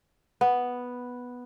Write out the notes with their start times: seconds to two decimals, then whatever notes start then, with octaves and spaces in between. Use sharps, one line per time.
0.41 B3